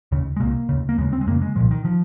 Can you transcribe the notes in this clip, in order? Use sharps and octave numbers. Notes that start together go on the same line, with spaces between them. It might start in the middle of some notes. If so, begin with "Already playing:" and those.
D#2 C#3
G#3
C2 C3 A#3
D#2 C#3
A#3
D#2 C#3 G#3
C4
G#3
F2 C#3 A#3
G#3
C2 A#2 F3
D#3
F3